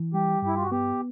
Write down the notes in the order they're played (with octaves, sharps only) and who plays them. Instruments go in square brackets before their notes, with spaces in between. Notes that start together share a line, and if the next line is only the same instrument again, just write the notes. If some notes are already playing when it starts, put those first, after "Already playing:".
Already playing: [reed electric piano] E3
[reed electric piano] G3 [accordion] G4
[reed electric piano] G2 [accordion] E4
[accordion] F4
F#4
[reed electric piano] B3 [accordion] G4